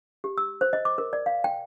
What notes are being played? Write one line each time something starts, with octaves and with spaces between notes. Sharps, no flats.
G4
E6
C5
D#5
D6
A#4
D5
F5
G5